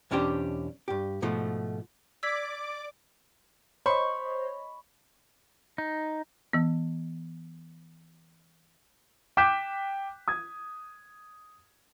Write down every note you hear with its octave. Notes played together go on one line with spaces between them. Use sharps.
B1 E2 C#4 D4 G4 C5
G2 G4
G#2 B2 F3 A3
D5 D6 E6 G#6 B6
C5 C#5 D#5 B5 C#6
D#4
E3 B3
G5 D6 F#6 G6 B6 E7
D#6 G#6